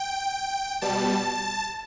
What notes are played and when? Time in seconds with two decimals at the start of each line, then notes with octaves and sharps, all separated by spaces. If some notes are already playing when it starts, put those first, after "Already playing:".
Already playing: G5
0.81 B2 G3 A5